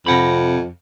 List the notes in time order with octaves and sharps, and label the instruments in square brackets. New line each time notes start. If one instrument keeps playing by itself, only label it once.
[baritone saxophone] F2 [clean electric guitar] C3 F#5 B5